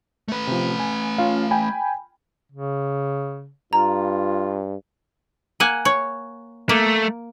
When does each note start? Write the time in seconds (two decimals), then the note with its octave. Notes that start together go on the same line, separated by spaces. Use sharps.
0.28 A3 B4
0.47 C3 F3
0.80 G#5
1.18 C#4 F4 F5
1.51 G5 G#5 B5
2.52 C#3
3.73 G2 F4 A#5
5.60 A#3 F#5 G#5
5.85 C#5
6.69 A3 A#3